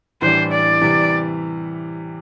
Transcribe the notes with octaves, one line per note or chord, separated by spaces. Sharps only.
A2 E3 G3 D4 C5
D5
C3 E3 G3